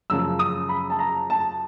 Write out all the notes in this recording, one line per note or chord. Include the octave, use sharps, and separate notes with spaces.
F#2 C#3 F3 E6
D#6
B5
A5
A#5
A5